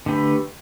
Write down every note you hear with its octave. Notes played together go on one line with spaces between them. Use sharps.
D3 A3 G4 B4